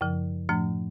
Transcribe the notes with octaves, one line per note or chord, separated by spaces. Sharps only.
F#2 C#3 F3
A2 F3 A3 D4